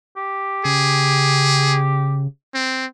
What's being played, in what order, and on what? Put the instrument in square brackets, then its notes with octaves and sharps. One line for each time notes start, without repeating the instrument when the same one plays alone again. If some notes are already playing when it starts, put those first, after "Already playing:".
[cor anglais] G4
[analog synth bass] C#3 [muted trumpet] G#4
[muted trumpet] C4